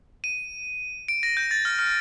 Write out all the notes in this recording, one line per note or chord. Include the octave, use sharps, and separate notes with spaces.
D#7
D7
A#6
G6
A6
F6
F6